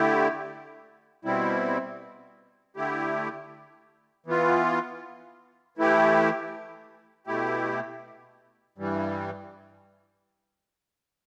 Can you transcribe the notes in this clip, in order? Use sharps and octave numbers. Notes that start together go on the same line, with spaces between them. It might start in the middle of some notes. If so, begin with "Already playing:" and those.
Already playing: D3 A3 E4 G4
B2 G3 C4 E4
D3 A3 E4 G4
E3 B3 F4
E3 A3 E4 G4
B2 A3 E4 G4
G2 E3 G3